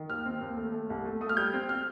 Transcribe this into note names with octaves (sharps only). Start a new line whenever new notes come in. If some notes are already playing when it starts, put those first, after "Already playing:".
Already playing: D#3
D#2 F6
C4
D#2
A3
A3
C2
A3
A3 D#6
F6
G3 G6
C4
F6